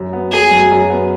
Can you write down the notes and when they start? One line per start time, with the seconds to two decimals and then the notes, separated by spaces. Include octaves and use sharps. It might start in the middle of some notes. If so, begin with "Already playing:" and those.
Already playing: F#2
0.13 B3
0.31 F#3 G#4
0.51 F#2
0.71 F#2
0.90 B3